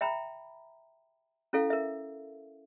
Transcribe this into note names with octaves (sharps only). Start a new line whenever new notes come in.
E5 G5 A#5 B5
C#4 E4 A4 F5
A#4 E5